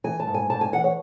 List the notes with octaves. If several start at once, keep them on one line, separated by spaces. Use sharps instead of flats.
E3 G#5
A5
G#2
G#5
G#2 A5
G#5
E3 F#5
C#5